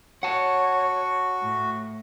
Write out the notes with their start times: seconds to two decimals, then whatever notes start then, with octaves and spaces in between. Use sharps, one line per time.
0.23 F#4 C#5 F#5 A5
1.42 A2